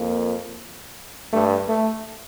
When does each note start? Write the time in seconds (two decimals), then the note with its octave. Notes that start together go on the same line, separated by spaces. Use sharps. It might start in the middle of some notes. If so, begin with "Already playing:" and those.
Already playing: F2 A#3
1.33 G2 A3
1.68 A3